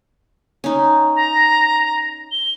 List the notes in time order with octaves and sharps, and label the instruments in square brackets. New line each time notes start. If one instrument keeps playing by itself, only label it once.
[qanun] C#4 D#4
[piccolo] A#5
G7